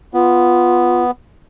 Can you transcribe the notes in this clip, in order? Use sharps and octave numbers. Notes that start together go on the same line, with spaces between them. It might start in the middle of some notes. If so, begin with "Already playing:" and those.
B3 F4